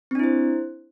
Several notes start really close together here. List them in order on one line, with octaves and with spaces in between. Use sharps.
C4 D4 E4 C5